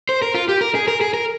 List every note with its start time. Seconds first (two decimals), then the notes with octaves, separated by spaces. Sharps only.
0.09 C5
0.22 A#4
0.35 F4
0.49 G4
0.61 A#4
0.75 G#4
0.88 A#4
1.01 G#4
1.14 A#4